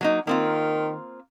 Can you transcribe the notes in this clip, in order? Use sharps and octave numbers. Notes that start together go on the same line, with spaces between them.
F#3 A#3 D#4
D#3 A#3 C4 F4